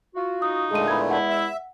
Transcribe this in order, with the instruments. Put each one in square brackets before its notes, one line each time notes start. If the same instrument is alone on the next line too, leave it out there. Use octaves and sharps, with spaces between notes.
[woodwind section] F4 F#4
[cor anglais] D#4 [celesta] D#6
[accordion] A#2 D3 A3 [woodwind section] G#3 [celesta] G#4 D#7
[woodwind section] E2 G#3 [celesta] B5 G#6
[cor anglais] E4 [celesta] F#5
[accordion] E5